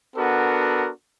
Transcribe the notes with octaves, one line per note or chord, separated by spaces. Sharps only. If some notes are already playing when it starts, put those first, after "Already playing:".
B3 D4 F#4 A4 A#4